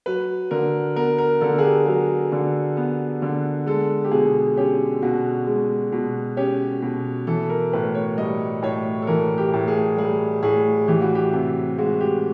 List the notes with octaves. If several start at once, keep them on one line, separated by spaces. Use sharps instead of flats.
F#3 B4
D3 A#4
B3 A#4
A#4
D3 A4
G#4
G4
F#3 G#4
D3
B3
D3
G#3 A4
G4
B2 G#4
C#4 G4
B2 F#4
G#3
B2
C#4 G4
B2
E3 A4
A#4
A2 B4
C#5
G3 D#5
A2 C#5
A4
E3 A#4
G4
A2
G#4
G3 G#4
A2 G#4
E3 G4
F#4
G4
C3 G4
G#3 F#4
G4